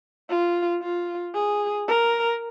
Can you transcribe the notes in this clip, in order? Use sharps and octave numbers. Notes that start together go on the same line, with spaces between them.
F4
F4
G#4
A#4